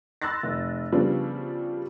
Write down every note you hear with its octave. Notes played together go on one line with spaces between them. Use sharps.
B5 C6 E6 F#6 A6 A#6
F1
C#3 F3 G3 B3 D4